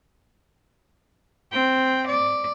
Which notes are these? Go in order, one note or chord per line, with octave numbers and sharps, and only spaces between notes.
C4 G5
D5